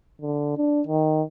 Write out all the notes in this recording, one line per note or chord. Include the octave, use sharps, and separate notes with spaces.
D3
D4
D#3